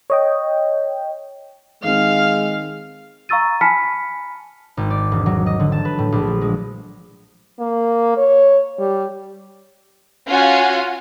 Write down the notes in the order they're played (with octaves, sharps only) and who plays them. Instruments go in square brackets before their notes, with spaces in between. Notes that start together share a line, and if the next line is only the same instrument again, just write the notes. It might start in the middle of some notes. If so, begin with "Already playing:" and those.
[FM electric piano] C#5 D#5 G5
[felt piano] D#3 C4 [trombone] G#3 [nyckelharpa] F5 [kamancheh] F6
[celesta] F5 A#5 C#6 E6 A6 D#7
G#5 A5 B5 F6 B6 C#7
[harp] G#1
D5
E1
F#3
D#5
D3
A5
B4
A2
A#1
F3
G#3
[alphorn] A#3
C#5
G3
[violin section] C#4 F4 F#4 F5 F#5 G#5